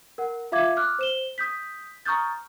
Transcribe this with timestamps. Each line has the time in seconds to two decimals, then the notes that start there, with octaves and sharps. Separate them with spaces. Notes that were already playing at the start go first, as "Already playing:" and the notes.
0.18 A#4 F#5
0.52 F4 E5 F5 D6 G#6
0.77 D6 F6 F#6
0.99 C5 E7 G7
1.38 D#6 G6 B6
2.06 A#5 C#6 D#6 F6 G6 A6